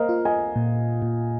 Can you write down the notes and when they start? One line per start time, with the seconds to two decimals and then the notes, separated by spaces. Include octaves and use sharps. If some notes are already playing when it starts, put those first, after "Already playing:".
Already playing: A#3 A#4 C5 D#5 F5
0.09 F4
0.25 D#5 G#5
0.56 A#2
1.02 A#2